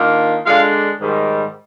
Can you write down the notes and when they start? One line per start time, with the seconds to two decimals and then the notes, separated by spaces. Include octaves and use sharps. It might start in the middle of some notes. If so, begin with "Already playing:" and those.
Already playing: D#3 A#3 D4 F4
0.46 D3 G#3 D4 F4 F5
1.00 G#2 D#3 G3